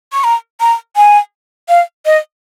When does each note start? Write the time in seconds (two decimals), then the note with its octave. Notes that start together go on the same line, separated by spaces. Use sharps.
0.13 C#6
0.24 A#5
0.61 A#5
0.96 G#5
1.69 F5
2.06 D#5